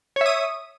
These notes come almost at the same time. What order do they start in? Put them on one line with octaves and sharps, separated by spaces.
C#5 E5 D#6